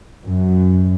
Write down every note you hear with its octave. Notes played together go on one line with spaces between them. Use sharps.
F#2